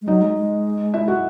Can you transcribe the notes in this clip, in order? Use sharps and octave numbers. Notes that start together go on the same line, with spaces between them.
G#3
F#3 D#4 D#5
G#3
G#3
E4 E5
F#4 F#5